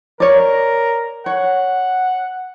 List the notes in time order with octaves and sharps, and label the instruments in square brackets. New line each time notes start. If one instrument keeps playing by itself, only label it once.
[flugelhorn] A#4 [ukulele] C#5 D5
[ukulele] C#5 [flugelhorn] F#5